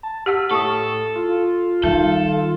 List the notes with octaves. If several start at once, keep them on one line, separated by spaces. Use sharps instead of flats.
A5
G4 F#5 E6 B6
A2 A4 C#6 D#6
F4
D#3 G3 A4